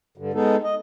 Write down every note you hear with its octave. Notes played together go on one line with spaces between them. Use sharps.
G2 D3
G#3 B3 D#4 A4
D#5